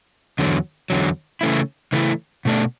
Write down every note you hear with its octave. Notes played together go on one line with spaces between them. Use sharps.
E2 D3 F#3
E2 D3 F#3
C#3 E3 A3 E4
C#3 E3 A3 E4
B2 A3 D4